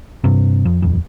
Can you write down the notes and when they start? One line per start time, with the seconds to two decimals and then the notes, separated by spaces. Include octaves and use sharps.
0.24 G2 C3
0.65 F2
0.82 D#1 F2